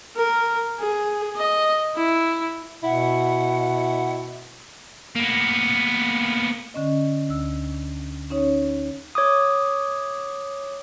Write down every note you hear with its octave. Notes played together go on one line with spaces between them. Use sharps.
A#4
G#4
D#5
E4
B2 E4 F#5
A#3 B3
D3 C#4 D#5
D2 E6
C#4 D#4 C#5
C#5 D6 D#6